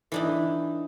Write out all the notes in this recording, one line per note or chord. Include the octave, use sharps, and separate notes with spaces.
E3 D4 D#4